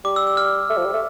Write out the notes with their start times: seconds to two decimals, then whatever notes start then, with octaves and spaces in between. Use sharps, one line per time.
0.05 G3 D6
0.16 E6
0.27 E6
0.37 F6
0.70 A3
0.77 F3
0.85 G3
0.93 A3